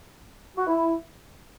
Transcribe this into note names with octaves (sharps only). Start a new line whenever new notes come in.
F#4
E4